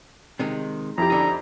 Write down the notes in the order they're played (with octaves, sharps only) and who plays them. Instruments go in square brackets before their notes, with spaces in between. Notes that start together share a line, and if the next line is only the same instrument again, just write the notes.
[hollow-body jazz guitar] C3 D#3 G#3
[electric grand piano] F2 E4 G4 [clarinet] A#5
[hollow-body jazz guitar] D3 D#4